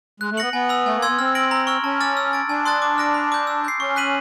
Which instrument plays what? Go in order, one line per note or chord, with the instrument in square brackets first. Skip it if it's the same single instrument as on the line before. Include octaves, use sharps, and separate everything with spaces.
[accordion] G#3 [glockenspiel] F#6
[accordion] A3
[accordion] B3 [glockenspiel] A#6 C#7 F#7
[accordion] B3 [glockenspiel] G#5
[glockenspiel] B5 E6
[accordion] A3 [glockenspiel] G#5
[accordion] A#3
[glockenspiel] C6 E6 G#6
[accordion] B3
[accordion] C4 [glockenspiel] F6
[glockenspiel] A#6 D7 F#7
A#5
C#6 F6
[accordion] C#4 [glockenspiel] A5
[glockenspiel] D6 F6 A6
E6
A6 D7
[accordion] D4 [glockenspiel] G#5
[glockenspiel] C6 D#6 F#6 A6
D6
F6 A#6 D7
B5
D6 G6
E6
G6 C7
[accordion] C#4 [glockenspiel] C#6
[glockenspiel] F#6 B6 D#7 F#7